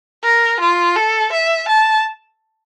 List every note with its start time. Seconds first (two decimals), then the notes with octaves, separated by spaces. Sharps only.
0.24 A#4
0.60 F4
0.96 A4
1.32 E5
1.69 A5